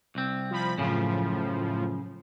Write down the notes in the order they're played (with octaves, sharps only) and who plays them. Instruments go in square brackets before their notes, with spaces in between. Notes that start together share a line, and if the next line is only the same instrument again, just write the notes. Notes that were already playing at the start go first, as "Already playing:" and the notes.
[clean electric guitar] C2 C4
[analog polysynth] F3 B5
[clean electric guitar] F#2 C#3 [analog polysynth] A2 F3